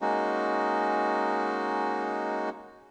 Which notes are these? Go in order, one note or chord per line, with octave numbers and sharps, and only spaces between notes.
G#3 A#3 C#4 D#4 F#4